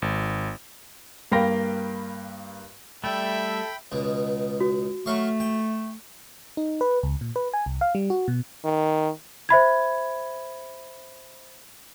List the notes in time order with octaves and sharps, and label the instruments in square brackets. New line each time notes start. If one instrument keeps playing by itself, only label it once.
[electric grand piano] G#1
[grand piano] G2 A#3 F5 G5 B5 A#6
[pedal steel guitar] G3 A3 [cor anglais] A4 [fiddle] E5 [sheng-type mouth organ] G5 B5
[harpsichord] C#2 B2
[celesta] F#4
[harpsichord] F#3 F5 C#6 [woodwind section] A3
[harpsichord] G5
[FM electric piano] D#4
B4
C#2
A#2
B4
G#5
C2
F5
G3
F#4
B2
[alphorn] D#3
[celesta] C5 E5 B5 G#6